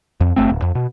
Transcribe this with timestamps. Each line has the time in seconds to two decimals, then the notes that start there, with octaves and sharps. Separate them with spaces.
0.21 F2
0.36 G1 A3 C4
0.50 D1
0.62 F2
0.75 B2